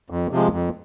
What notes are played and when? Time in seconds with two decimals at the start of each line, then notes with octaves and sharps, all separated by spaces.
0.10 F2
0.31 C3 F3 G#3
0.52 F2